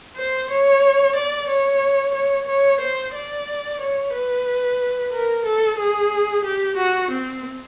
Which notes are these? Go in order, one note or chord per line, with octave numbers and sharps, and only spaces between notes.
C5
C#5
D5
C#5
C#5
C#5
C5
D5
C#5
B4
A#4
A4
G#4
G4
F#4
C4